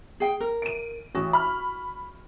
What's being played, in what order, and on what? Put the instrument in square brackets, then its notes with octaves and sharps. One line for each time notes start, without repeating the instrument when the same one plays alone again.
[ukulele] G#4 G5
A#4
[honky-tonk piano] D7 D#7
[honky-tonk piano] A1 [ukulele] F#4
[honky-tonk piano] B5 F6